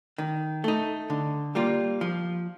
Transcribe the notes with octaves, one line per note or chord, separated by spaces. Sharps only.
D#3
A3 D#4
D3
G3 A#3 F4
F3